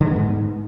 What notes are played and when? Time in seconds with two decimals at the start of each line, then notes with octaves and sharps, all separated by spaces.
0.01 D3
0.06 G#3
0.11 B3
0.16 G#2